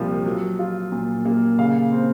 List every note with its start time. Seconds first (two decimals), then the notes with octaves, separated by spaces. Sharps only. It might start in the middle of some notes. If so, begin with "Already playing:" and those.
Already playing: C2 A#2 F3 A#3
0.25 F#3
0.59 F4
0.92 A#2
1.25 A#3
1.59 C#3 F5
1.92 C4